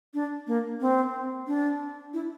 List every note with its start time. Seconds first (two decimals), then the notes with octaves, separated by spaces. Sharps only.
0.14 D4
0.47 A#3
0.81 C4
1.47 D4
2.14 E4